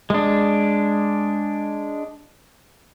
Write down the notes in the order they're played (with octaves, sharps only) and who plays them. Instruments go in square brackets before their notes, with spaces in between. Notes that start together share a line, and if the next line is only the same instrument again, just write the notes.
[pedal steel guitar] G#3 D4